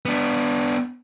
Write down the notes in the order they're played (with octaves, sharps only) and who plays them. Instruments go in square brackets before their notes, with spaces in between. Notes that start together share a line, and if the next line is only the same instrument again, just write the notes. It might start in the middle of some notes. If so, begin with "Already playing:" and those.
[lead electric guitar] B3 D4